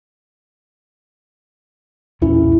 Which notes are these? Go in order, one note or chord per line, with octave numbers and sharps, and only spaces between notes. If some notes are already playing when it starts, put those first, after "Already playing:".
B1 E2 A#2 C#4 E4